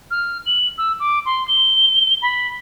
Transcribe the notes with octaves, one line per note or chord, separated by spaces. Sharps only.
F6
F#7
E6
D6
C6
G7
B5